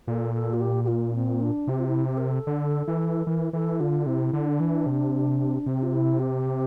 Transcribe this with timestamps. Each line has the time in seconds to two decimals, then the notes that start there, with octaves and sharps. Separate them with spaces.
0.07 A#2 A4
0.34 A4
0.53 F4
0.60 G4
0.83 G4
0.87 F4
1.14 C4
1.41 D4
1.67 C3 G4
1.79 F4
1.87 E4
2.07 G4
2.17 A#4
2.27 A4
2.47 D3
2.88 E3
3.27 E3 A#4
3.53 E3 A4
3.80 D3 F4
4.06 C3 E4
4.33 D3
4.47 D4
4.60 E3
4.86 C3
5.66 C3 C4
5.82 F4
5.93 E4
6.19 G4